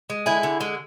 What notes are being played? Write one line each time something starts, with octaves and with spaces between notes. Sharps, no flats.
G#3
D3 E4 G#4
D3
G#3